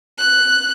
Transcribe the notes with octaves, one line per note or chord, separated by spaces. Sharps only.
F#6